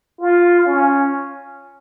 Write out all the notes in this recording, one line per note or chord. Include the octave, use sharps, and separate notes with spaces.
F4
C#4